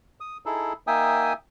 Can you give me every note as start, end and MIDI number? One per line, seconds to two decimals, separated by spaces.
0.20 0.37 87
0.46 0.73 63
0.46 0.73 64
0.46 0.73 68
0.46 0.73 69
0.87 1.33 58
0.87 1.33 63
0.87 1.33 76
0.87 1.33 79
0.87 1.33 80
0.87 1.33 87